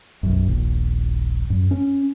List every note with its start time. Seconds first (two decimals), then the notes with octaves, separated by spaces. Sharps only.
0.23 B1 F#2
0.45 D#1 A#1
1.50 F#2
1.71 C#4